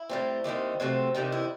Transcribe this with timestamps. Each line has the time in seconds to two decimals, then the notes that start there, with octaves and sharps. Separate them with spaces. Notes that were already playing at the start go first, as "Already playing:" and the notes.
Already playing: E4
0.09 A2 G3 C4
0.44 D#2 D#3 G3 C4
0.80 C3 F#3 A3 C4
1.15 E2 C3 D#3 G3 D#4
1.32 E4